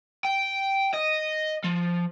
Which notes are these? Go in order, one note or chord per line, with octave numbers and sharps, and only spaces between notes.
G5
D#5
F3